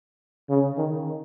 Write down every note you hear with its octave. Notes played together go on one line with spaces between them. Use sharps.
C#3
D#3